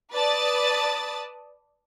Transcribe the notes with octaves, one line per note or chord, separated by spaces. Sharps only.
B4 D5 A5 D#6 A6